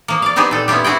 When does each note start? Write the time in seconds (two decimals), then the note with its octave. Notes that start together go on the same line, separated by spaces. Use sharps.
0.08 F3 A#3
0.22 D5 F5
0.36 B3 C4 D#4 G4 G#4 C5
0.51 A#2 A4
0.68 B3 C#4 E4 F4 G4
0.84 C4 E4 F#4 G#4 G5